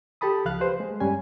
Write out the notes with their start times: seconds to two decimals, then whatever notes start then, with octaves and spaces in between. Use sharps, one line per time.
0.21 G4 A4 A5 B5 D#6
0.45 C#2 F3 F5 F#6
0.60 G4 B4 C5
0.80 G#3
1.00 G2 G3 C#4 G#5